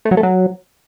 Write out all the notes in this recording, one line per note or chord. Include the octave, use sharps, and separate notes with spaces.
A3
F#3
A3
F#3